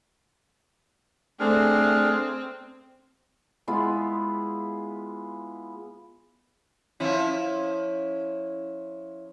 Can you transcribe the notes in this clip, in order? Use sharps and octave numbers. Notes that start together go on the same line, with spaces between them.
A3 C4 D4 G#4 F6
G#3 B3 E4 F4
F3 C#4 E4